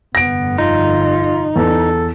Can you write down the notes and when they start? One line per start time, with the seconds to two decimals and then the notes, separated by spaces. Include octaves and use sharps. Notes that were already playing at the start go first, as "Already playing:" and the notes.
0.15 F1 G2 D3 B3 A#6 D7
0.58 D#4 F4
1.56 E2 A4